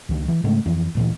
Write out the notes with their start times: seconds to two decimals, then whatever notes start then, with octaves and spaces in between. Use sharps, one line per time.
0.09 C#2 D#3
0.28 E3
0.44 G#2 C#3 G#3 A3
0.66 F2 E3
0.95 D1 A#2 E3